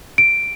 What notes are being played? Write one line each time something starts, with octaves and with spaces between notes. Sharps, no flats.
D7